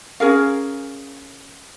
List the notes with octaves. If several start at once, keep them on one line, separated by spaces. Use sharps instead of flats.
C#4 G#4 A#4 F5